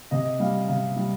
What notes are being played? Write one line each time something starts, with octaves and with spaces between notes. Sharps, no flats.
C3 D#5
G3 F5
C3 F5
G3